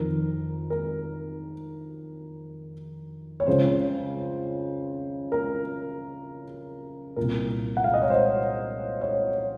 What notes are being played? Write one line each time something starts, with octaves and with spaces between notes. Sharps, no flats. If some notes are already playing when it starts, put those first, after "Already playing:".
Already playing: F2 D#3 A#4
A#4
C#5
C#2 C#3 C5
A#4
A#2 A#4
C2
F#5
F5
D#5
C#5
C5
C#5